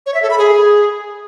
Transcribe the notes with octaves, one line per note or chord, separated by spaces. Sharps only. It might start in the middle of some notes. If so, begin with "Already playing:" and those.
C#5
E5
A4
B5
G#4